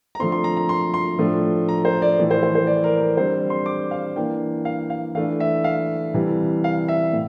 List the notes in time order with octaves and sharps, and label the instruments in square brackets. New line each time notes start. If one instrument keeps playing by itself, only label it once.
[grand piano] A#5
D3 F3 A3 C4 C6
C6
A#5
A#5
C6
C6
A2 F3 A3 D4
A#5
C5
D5
A2 E3 A3
C5
C5
C5
D5
A#4
A#4
D3 G3 C4 C5
C6
D6
F5
E3 A#3 D4 G5
F5
F5
E3 A3 D4 F5
E5
F5
C3 E3 G3
F5
E5
A2